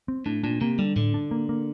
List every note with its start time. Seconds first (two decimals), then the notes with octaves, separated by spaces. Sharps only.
0.08 C4
0.26 A2 D4
0.43 A#2 D4
0.61 C3 A#3
0.79 D3 G3
0.96 A2 D3
1.14 D4
1.31 A#3
1.49 A#3